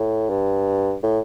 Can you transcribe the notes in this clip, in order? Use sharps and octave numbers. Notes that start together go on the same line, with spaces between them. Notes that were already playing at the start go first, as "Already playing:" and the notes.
Already playing: A2
G2
A2